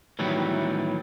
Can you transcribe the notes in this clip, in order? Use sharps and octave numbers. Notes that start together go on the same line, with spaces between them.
A2 D#3 E3 F#3 G3 B3